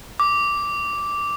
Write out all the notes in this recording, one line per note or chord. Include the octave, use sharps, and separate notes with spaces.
D6